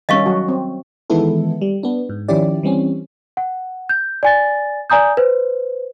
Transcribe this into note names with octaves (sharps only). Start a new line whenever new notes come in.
D#3 G3 C#4 D#5 F5 C#6
F#3 F#4
C4
D#3 E3 G#3 B3 E4 A4
G3
B3 D4
G#2
D#3 F3 C#4 E4 G4 D5
E3 G3 C4 C#4
F#5
G6
D5 G#5 A6
D5 G#5 A#5 D#6 G6
B4 C5